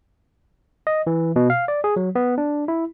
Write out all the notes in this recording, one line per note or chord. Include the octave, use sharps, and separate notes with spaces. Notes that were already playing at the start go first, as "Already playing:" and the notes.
D#5
E3
B2
F5
D5
G#4
F#3
B3
D4
E4